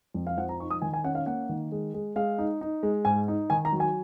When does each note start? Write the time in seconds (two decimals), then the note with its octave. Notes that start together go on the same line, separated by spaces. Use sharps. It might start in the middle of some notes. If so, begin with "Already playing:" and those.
0.14 F2
0.27 F5
0.37 F3 F#5
0.49 A#5
0.60 D#4 C#6
0.71 D#6
0.82 D#3 G#5
0.94 G#5
1.04 C#4 F#5
1.15 F5
1.26 A#3 F#5
1.49 D#3
1.72 G#3
1.94 G#3
2.16 G#3 F5
2.38 D#4
2.61 D#4
2.83 G#3
3.05 G#2 G#5
3.28 D#4
3.50 D#3 G#5
3.65 A#5
3.72 F#3
3.80 G#5